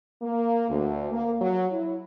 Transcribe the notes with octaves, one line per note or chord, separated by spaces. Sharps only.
A#3
D2
A#3
F#3
E4